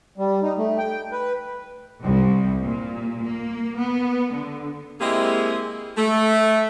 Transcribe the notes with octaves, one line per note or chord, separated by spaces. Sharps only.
G3
D#4
A3
G5
B4
C2
A#2
A#3
B3
D3
G#3 A#3 C4 E4 G4 G#4
A3